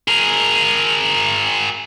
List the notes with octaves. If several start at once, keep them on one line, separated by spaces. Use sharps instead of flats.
G#4 A#4